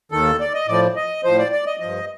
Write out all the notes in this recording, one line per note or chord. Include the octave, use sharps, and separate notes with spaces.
D#2 D#3 A4
D5
D#5
A2 F3 D5
D#5
A2 F3 C5
D5
D5
D#5
G2 F3 D#5